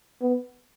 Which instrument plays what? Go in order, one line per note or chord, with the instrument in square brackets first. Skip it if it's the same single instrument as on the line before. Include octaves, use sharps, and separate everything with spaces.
[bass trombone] B3